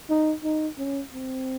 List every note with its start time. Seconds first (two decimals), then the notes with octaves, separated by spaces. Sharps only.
0.10 D#4
0.44 D#4
0.78 C#4
1.14 C4